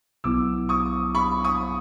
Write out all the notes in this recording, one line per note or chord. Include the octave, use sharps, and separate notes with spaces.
B1 B2 F#3 B3 E4 D6 E6
C#6 D#6
B5 C#6
C#6 D#6